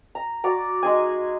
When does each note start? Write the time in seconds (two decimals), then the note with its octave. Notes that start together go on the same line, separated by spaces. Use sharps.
0.15 A#5
0.44 F#4 D5 A#5
0.83 G#3 D#4 G#4 G#5